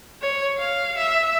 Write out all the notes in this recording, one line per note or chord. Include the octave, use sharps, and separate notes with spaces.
C#5
F5
E5